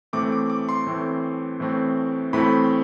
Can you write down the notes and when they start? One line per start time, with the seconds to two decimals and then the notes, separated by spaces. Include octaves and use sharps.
0.13 A2 E3 A3 C4 D6
0.32 D6
0.50 D6
0.69 C6
0.87 A2 E3 A3 C4
1.60 A2 E3 A3 C4
2.33 A2 E3 A3 C4 B5